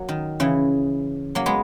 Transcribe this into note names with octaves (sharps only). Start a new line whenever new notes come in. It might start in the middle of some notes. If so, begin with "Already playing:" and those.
Already playing: F#3 A#3
D#3
C#3 E3
F#3 A#3
G#3 B3